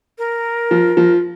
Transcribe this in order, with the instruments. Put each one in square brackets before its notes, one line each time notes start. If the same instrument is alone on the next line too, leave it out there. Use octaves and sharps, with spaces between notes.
[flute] A#4
[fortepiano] F3
F3